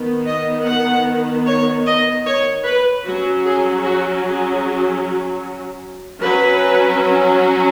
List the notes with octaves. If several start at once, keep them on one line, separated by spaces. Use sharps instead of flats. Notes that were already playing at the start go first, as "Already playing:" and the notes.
Already playing: D#3 B3
D#5
F#5
C#5
D#5
C#5
B4
F#3 C#4 F#4
G#4
F#4
G#4
F#3 C#4 B4